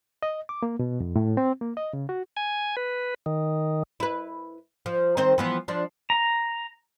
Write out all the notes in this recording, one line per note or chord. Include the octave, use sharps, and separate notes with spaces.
D#5
D6
A#3
B2
F2
A2
C4
A#3
D#5
C#3
F#4
G#5
B4
D#3
E4 B4
F3
D#3 C4 C5
E3 F3 B3
F3 D4
A#5